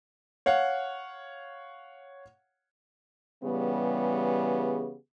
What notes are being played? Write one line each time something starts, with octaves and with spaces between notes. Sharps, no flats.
C#5 F5 F#5
C#3 E3 G3 B3 G4 G#4